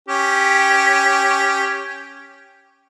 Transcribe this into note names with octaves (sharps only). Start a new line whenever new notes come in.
C#4 G4